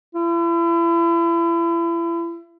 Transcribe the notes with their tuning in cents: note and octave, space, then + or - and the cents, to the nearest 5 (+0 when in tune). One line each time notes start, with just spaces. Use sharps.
E4 +35